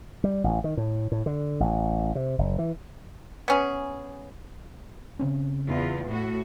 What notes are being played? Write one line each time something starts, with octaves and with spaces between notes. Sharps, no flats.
G3
A1
D#3
A2
A2
D3
A1
C3
F#1
E3
B3 C#4 G#4
C#3 C4 C#4
E2 F4
A2 F#4